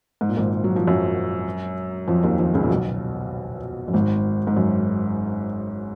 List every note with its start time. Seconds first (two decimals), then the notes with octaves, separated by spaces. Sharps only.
0.21 G#2
0.29 A#2
0.37 G#1 G#2
0.64 F#3
0.76 F3
0.88 F#2 F#3
2.07 F2 F3
2.23 D#2 D#3
2.39 F2 F3
2.54 C#2 C#3
2.63 A#2
2.69 B1 B2
3.88 F#2
3.93 G#1 G#2
4.47 G#2
4.57 F#2